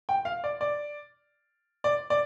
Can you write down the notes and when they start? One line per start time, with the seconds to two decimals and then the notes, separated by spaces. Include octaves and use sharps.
0.09 G5
0.25 F5
0.44 D5
0.61 D5
1.84 D5
2.10 D5